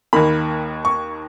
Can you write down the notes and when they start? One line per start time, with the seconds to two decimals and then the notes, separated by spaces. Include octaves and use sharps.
0.13 D#2 D#3 A#3 B5
0.85 C#6